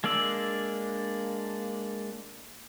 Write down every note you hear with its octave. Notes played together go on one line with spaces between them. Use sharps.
G#3 A#3 D4 D5 E6